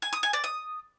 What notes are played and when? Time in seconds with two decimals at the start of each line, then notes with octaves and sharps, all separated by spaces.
0.02 G#5
0.13 D#6
0.23 G#5
0.33 D5
0.44 D#6